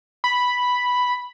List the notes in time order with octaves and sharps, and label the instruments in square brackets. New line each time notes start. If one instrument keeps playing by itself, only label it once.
[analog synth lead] B5